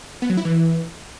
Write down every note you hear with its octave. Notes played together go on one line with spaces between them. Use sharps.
B3
F#3
E4
E3